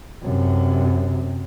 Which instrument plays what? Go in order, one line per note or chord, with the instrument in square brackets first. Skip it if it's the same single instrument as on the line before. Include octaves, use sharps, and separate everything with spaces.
[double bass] F#2 C3